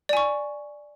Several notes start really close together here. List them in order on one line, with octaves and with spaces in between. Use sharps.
D5 G#5 C#6